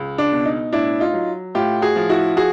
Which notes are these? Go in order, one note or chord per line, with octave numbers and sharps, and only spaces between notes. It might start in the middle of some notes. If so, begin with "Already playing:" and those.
Already playing: C#2
D4
B2
D#4
A2 D4 E4
D#4 F4
F#3
A2 F4 G4
F#4 G#4
F3
E4 F#4
F#4 G#4